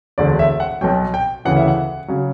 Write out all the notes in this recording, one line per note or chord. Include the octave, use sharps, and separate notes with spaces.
E1 D2 D3 D5
E5
F#5
B1 B2 F#3 G5
G5
E1 D2 C#3 E3 F#5
E5
F#5
C#3 F#3